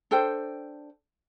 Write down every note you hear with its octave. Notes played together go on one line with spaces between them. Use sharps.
D4 A4 C5 G5